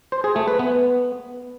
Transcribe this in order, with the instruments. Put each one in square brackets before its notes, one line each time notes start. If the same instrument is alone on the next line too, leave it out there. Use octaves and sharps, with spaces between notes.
[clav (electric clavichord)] C5
G#4
A3
B4
B3